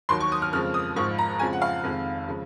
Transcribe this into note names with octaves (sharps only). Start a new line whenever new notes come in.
D#2 D#3 F#3 C6
C#6
D#6
F6
F2 C#3 F3 G#3 F6
D#6
G#1 G#2 F3 G#3 C#6
A#5
F2 C#3 F3 G#3 G#5
F#5
F5
F1 F2 C3 D#3 G#3
C#3 F3 G#3